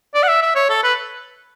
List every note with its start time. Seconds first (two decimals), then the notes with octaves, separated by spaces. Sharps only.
0.15 D5
0.23 F#5
0.28 E5
0.42 E5
0.55 C#5
0.69 A4
0.83 B4